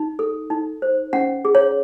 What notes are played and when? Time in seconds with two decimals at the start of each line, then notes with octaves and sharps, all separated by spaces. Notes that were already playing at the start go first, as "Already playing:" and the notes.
Already playing: D#4
0.19 A4
0.50 D#4
0.82 C5
1.13 C#4 F#5
1.45 G#4
1.55 C#5